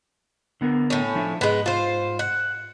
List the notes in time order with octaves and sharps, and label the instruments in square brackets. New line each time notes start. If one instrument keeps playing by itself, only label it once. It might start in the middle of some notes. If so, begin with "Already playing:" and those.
[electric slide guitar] D3 B3 A#4
[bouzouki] A2 C#4
[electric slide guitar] F3 D4 E4
[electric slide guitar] G#2 [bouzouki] G#3 B3
[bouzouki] F4 C5
F#5